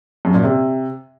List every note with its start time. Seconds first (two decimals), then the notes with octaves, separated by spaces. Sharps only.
0.25 F#2
0.34 A#2
0.43 C3